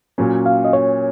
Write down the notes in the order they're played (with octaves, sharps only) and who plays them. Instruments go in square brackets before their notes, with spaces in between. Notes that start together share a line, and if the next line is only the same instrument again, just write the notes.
[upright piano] A#2 F#3 C#4
[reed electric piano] F5
D#5
C#5